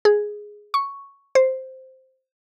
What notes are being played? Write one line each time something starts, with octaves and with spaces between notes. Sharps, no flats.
G#4
C#6
C5